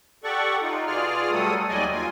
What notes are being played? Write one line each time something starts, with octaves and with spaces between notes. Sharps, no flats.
G4 A4 D5 F#5 C#6
D#4 F4
B2 F4 G#4 D5 F6
F#3 G3 A3 A4 D#6
D#2 F#3 G3 D5 D#5 G#5
F4 G#5